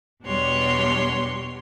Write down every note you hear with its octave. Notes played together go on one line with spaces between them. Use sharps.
E2 B2 G3 D4 C#5 C6